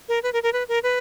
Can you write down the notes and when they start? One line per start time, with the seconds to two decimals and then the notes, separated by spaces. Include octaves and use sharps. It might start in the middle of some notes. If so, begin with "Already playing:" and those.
0.09 A#4
0.23 B4
0.33 A#4
0.43 A#4
0.53 B4
0.69 A#4
0.83 B4